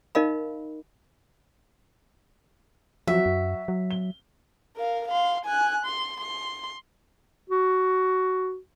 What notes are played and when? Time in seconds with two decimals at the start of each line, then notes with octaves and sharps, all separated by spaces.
0.15 D#4 A#4 D#5 F5 B5
3.07 F3 F#3 F#4 E5
3.26 F#2
3.68 F#3
3.91 G7
4.77 A#4 F5
5.08 F5 C6
5.45 G#5 F#6
5.85 C6
6.20 C6
7.50 F#4